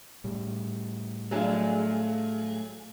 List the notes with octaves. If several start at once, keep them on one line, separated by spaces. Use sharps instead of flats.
A2 G3
F#3 A3 D4 F4 G#4